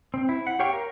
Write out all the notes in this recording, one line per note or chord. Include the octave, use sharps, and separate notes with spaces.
C4
E4
F#5
G4 C#5 F5 G5 C#6
A#4